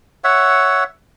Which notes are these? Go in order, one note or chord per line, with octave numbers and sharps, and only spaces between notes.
C#5 E5 F#5